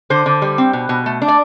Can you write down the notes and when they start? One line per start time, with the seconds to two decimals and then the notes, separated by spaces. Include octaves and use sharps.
0.10 D3 C5
0.26 D3
0.42 G3
0.58 C4
0.73 B2
0.89 B2
1.06 A3
1.22 D4
1.28 D5